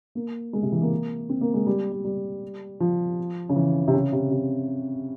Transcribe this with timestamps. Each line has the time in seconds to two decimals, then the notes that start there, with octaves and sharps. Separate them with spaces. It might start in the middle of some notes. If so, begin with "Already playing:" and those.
0.15 A#3
0.53 G#3
0.63 C3
0.72 E3
0.82 A#3
1.29 C4
1.41 A#3
1.54 G#3
1.66 G3
1.92 G3
2.04 G3
2.80 F3
3.49 C#3
3.56 E3
3.88 C3
3.94 C#3
4.12 C3
4.31 C3